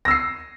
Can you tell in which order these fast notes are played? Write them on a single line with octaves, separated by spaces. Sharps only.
A#6 E6 C7